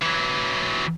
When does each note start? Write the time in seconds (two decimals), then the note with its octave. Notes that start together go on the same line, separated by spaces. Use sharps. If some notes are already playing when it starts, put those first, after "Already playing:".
0.02 E3 F#3